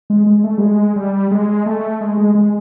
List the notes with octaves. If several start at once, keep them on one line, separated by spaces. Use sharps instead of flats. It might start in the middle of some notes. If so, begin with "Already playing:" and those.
G#3
G#3
A3
G3
G#3
G3
G#3
A3
G#3
G#3
G#3